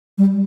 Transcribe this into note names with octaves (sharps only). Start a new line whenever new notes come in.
G3